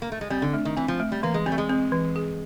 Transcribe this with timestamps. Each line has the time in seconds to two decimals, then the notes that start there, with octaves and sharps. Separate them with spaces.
0.02 A#3
0.12 A3
0.21 G#3
0.30 G3 C4
0.42 D3
0.54 A3
0.65 D#3
0.77 E3 C4
0.88 F3
1.00 A3
1.12 G3
1.23 E3 A#3
1.34 G#3
1.46 G3 C4
1.52 A3
1.58 G#3
1.70 C4
1.92 E3
2.16 G#4